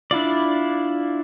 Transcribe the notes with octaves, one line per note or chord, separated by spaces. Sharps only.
D4 E4 F4 D5